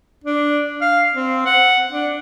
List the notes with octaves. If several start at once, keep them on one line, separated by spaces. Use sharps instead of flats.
D4
F5
C4
F#5
D4